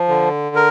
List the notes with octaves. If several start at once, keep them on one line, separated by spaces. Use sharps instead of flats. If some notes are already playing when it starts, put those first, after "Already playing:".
Already playing: F3
D3
A#4